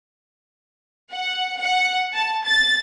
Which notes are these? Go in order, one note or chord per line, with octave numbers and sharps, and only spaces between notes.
F#5
F#5
A5
A6